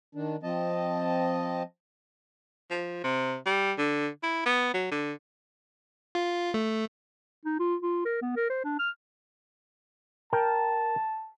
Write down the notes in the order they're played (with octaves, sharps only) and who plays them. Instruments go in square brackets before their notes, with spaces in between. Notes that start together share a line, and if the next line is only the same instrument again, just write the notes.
[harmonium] D#3 D4
F3 C4 D#5 A5
[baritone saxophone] F3
C3
G3
D3
E4
B3
F#3
D3
[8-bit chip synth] F4
A3
[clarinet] D#4
F4
F4
A#4
B3
A#4
C5
D4
F6
[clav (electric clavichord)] A#4 G5 [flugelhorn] A5